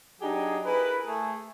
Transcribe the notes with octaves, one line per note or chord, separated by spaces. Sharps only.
F#3 D4 D#4 G4 G#4
E4 G#4 A#4 B4
A3 G#4